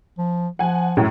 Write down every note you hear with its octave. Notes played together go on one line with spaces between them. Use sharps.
F3
F3 F#5 G#5
F#2 A2